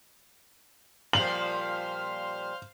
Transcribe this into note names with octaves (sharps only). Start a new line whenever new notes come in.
A#2 F3 G3 C5 F5 F#7